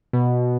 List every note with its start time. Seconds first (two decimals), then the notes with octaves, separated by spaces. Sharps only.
0.13 B2